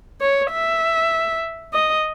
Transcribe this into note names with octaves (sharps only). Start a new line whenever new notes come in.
C#5
E5
D#5